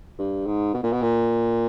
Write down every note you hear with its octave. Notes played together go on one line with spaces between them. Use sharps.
G2
G#2
B2
A#2
B2
A#2